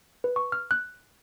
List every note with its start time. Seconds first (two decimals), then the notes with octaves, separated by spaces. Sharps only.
0.24 B4
0.36 C#6
0.52 F6
0.71 F#6